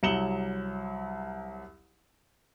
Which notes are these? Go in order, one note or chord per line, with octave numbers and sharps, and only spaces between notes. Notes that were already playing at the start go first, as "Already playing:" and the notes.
C2 F#3 C#7 E7 F#7 G7